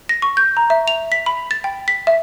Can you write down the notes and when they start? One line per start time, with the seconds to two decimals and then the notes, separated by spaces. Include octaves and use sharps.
0.09 A#6
0.22 C#6
0.37 G6
0.57 A#5
0.70 E5
0.88 F7
1.12 B6
1.26 B5
1.51 A6
1.64 G5
1.88 B6
2.07 E5